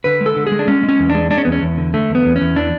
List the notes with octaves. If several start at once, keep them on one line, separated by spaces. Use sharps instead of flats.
D3 B4
G#3
A4
D3
G#4
G#3
D4
G#3 C#4
G#3
C#4
E2
D4
G#3
G#3 D4
C#4
E2 B3
C#4
E2
D3
D3 A3
E2
B3
E2
C#4
E2
E3 D4